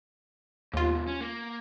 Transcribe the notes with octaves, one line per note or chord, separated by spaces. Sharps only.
D#2 G#2 B2 F4
C#4
A#3